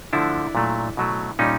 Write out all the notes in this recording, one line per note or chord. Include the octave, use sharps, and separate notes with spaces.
D3 F3 A3 D4 E4
A#2 F#3 A3
B2 F#3 A3
A#2 G3 C#4 D#4